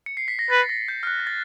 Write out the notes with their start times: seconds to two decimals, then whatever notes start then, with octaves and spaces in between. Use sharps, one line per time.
0.06 C#7
0.17 C7
0.28 B6
0.39 A#6
0.50 B4 A6
0.69 A#6
0.88 G6
1.03 F6
1.07 F#6
1.20 A#6
1.27 A6